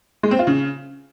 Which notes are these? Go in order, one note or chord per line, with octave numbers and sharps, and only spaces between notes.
G#3
C4
F4
C#3